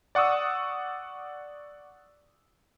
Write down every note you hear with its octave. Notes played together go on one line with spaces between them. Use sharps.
D5 F#5 C#6 D#6 E6